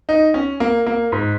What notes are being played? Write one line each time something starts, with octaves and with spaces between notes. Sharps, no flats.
D#4
C#4
A#3
A#3
G#2